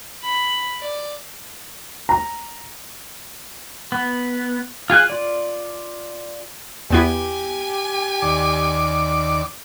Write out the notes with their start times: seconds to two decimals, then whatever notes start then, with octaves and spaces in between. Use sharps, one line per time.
0.23 B5
0.82 D5
2.09 A#5
3.92 B3
4.90 F4 G#4 G#5 F#6
5.10 F4 D5
6.90 E2 B3 E4 G4 G#5
8.22 D#2 D5 D6